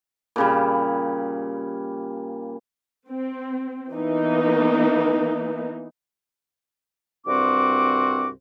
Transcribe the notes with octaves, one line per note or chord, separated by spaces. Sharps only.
A#2 C#3 G3
C4
E3 A#3 B3 D#4
C2 G2 C4 F#4 C5 D6